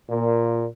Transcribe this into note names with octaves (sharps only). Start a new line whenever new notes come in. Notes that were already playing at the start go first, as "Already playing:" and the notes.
A#2